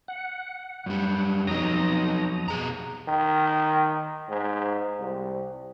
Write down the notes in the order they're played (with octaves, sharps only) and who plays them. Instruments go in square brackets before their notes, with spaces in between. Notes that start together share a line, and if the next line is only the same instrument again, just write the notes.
[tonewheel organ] F#5
[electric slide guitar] F#2 G3
[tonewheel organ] F2 A#5 D#6 [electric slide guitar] F#3 D#4
[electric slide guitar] B2 G#4 A#5
[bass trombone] D#3
G#2
C2